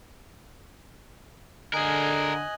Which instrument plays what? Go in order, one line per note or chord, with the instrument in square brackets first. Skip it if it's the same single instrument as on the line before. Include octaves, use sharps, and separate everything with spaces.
[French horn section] D3 [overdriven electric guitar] G#4 A#4 [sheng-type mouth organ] D#5 G#5 F#6